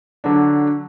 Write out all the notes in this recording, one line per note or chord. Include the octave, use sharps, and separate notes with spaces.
D3 F#3 D4